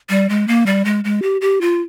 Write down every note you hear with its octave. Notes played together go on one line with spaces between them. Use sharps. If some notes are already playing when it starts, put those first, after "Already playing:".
G3
G#3
A#3
G3
G#3
G#3
G4
G4
F4